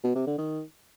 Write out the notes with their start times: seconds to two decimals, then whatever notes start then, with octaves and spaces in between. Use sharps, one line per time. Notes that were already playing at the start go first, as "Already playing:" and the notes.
0.04 B2
0.15 C3
0.27 D3
0.38 D#3